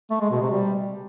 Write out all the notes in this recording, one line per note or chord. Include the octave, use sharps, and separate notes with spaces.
A3
G#3
B2
C3
G3